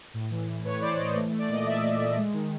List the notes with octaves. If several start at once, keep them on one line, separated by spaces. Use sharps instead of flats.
A2
E3
A2
A2 B4 C#5
E3 C5 D5
E3 C#5 D#5
A3
A3
D5
A#2 D#5
A#2 D5 E5
A#2
A#2
G#3
D#3